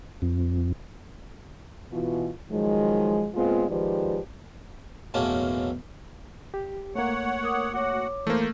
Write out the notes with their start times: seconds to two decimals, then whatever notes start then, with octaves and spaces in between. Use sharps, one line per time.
0.22 F2
1.91 B2 E3 F4
2.51 D#3 F3 F#3 G#3
3.34 A#2 G#3 B3 C4 F4
3.68 D#3 F3 G#3 G4 B4 D5
5.14 B1 E2 A2 A3 A#3 C#4
6.54 G4
6.95 A3 A#3 C#5 F#5
7.44 A#4 D6 D#6
7.74 F#4 C#5 F#5 D6
8.27 E3 A3 A#3 C5